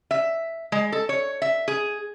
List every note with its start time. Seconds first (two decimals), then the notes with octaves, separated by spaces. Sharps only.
0.11 E5
0.72 G#3
0.92 A4
1.09 C#5
1.42 E5
1.68 G#4